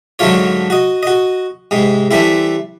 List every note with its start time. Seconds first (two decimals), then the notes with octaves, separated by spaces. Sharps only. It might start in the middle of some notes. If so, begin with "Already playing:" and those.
0.19 G#2 D3 F#3 A3 F4 C#5
0.70 F#4 D#5
1.03 F#4 D#5
1.71 G#2 C3 G#3
2.11 E3 G3 A3 C4 E4